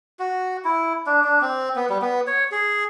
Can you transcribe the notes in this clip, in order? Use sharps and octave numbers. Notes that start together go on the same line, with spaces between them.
F#4
E4
D4
D4
C4
B3
G3
B3
C#5
G#4